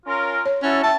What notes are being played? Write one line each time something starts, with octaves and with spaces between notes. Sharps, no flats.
C#4 F4 A#4
C#5
C#4 E4 F#4 A4
E5 G5 A5